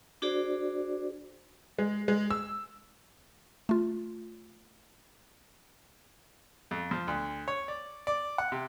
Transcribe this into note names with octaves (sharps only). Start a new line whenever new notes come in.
D4 F#4 G#4 C5 D5
G#3
G#3
E6
A3 F4
F2
F3
D2
C#5
D5
D5
F#5
C3